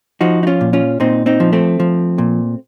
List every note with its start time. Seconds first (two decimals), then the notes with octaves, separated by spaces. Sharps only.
0.21 F3 D#4 F#4
0.43 D#4
0.47 C#4 F4
0.61 A#2
0.73 C#4 F4
1.00 A#2 C4 D#4
1.26 C4 D#4
1.40 F3
1.53 A3 C4
1.80 F3
2.18 A#2